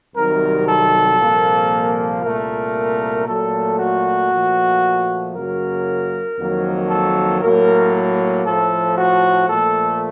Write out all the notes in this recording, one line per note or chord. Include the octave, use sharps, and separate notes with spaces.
C2 C3 D#3 F#3 A#4
A4
C2 A#2 F3 A#3
C2 A#2 A3 A#4
A#2 F#3 A3 A4
F#4
A#2 F3 A3
F#2 C#3 F#3 A#3 A#4
F2 D#3 F#3 A#3
A4
A2 F#3 A#3 A#4
A2 F3 A3 A4
F#4
A#2 F3 A3 A4